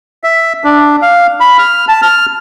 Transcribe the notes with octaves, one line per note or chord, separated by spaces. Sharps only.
E5
D4
F5
B5
F6
A5
F6